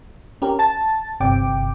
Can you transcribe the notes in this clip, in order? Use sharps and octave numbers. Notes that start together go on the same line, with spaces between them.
C#4 G4 A#4
A5 A6
G1 C3 G5 D6